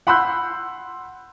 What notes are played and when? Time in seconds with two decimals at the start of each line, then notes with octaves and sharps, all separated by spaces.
0.07 F#5 B5 C6 E6 F#6 G6